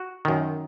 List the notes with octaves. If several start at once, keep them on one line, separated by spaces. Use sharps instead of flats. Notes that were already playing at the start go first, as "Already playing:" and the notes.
Already playing: F#4
F#2 D#3